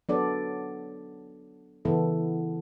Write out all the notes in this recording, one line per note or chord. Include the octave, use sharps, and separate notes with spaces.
F#3 B3 D4 A4 D5
C#3 E3 B3 E4 A4